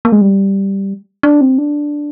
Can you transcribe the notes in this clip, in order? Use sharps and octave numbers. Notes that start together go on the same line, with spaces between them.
A#3
G#3
G3
D4
C4
D4